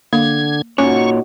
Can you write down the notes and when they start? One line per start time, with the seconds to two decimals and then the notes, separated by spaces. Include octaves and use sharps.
0.13 D3 A#3 G#6
0.78 A#2 C#4 D#4 F#4 C#5 C#6